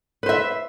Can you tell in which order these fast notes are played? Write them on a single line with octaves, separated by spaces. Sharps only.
B4 C5 E5